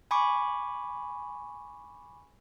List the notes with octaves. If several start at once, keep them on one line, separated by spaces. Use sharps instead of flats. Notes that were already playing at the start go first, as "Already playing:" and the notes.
G#5 B5 C#6 D6